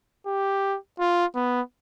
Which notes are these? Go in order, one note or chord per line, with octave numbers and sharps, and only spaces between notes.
G4
F4
B3